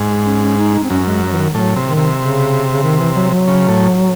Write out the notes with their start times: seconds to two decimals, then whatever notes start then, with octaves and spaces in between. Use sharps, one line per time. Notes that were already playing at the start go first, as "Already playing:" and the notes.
Already playing: G#2
0.26 C#4
0.42 C#4
0.58 D#4
0.74 D#4
0.84 C4
0.90 F#2 C#4
1.07 G#3
1.22 F#3
1.33 E3
1.38 D#3
1.54 A2 F#3
1.76 C3
1.86 D#3
1.97 C3
2.18 C#3
2.73 C#3
2.83 D#3
2.99 E3
3.15 F#3
3.31 F#3
3.48 C#3
3.68 A2